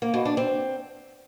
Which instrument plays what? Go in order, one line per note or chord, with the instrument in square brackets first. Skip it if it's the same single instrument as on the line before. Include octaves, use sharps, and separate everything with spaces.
[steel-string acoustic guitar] A#3
B2
D4
C4